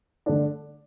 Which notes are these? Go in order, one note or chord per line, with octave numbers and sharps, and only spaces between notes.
D3 A3 D4